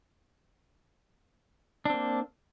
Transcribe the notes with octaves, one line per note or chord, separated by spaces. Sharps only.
A#3 C4 D4